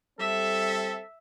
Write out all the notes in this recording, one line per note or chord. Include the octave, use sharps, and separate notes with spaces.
G3 C4 A4 E5